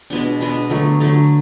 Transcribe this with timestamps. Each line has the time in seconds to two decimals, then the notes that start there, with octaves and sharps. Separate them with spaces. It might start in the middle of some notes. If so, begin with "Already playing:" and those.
0.10 B2 G#3 B3 D4
0.40 B2 G#3 B3 D4
0.70 D3 F#3 A3
1.00 D3 F#3 A3